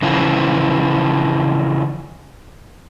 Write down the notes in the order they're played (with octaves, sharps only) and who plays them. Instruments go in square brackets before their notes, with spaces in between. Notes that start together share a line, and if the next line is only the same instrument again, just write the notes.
[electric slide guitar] C#3 E3 F3